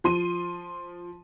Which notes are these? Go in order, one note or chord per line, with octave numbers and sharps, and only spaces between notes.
F3 C6 D#7